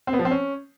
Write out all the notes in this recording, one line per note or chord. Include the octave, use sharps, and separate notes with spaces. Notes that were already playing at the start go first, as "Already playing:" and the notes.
C4
B3
F3
C4
C#4